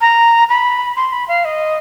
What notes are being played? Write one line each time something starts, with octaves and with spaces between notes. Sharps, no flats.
A#5
B5
C6
B5
F5
D#5